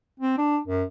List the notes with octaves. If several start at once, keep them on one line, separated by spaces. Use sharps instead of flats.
C4
D4
F#2